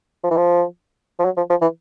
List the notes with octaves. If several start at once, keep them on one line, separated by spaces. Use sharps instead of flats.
F3
E3
F3
F3
F#3
F3
F3
E3